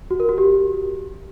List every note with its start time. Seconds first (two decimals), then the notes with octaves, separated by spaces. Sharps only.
0.11 F#4
0.20 A#4
0.29 F#4
0.38 G4